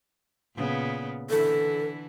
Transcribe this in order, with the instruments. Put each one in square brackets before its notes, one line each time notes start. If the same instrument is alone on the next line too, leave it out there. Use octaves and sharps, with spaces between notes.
[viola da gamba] A#2 C#3 B3
[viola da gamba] D3 E3 E4 [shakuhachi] A4